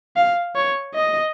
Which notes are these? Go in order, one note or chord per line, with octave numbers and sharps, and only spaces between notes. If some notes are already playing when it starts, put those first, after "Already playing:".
F5
C#5
D#5